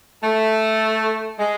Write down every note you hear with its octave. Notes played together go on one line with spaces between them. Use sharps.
A3
G#3